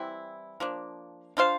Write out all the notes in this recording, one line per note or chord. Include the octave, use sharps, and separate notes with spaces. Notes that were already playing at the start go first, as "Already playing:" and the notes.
Already playing: E3 G3 C4 E4
F3 A#3 D4
D4 F4 C5 F5